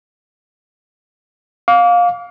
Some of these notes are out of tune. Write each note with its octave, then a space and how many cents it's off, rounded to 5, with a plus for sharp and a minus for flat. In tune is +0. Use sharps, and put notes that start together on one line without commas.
F5 +20 D6 -35